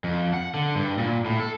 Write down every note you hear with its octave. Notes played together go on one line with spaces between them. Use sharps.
F2
F#5
D3
G2
A#2
A2
A4